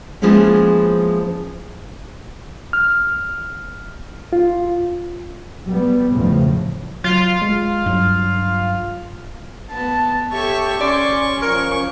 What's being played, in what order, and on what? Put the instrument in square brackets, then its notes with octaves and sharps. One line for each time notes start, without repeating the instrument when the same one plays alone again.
[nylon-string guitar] E3 F3 G#3 A#3 B3 C#4
[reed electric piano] F6
F4
[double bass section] G3 B3
E2 A2 C#3 F3
[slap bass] F#3 [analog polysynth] F4 F5
[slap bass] G#3
G2 F#3
[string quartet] B3 [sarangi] A5
[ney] G4 [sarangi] A4 [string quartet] C#5 E5 C#6
[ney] C#4 [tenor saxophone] D5 [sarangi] C6 [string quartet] C#6
[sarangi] F3 [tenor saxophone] A#4 [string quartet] C#6